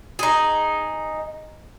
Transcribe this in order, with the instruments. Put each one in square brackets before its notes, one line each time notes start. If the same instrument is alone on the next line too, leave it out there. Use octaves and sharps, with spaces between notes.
[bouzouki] D#4 G#4